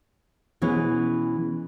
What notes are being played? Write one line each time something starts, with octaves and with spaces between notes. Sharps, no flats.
B2 E3 G#3 C#4